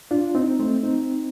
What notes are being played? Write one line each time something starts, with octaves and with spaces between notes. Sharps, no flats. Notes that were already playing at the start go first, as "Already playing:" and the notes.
D4 F4
C4 D#4
A3 C4
C4 D#4